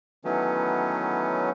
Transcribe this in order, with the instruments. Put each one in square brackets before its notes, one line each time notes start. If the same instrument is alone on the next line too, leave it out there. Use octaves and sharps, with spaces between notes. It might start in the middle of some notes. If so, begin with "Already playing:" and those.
[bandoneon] D#3 E3 F#3 A3 B3 C#4